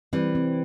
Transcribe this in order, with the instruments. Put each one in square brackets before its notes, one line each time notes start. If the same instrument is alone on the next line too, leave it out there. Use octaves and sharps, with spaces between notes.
[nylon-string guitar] E3 G3 [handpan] C4
[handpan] C4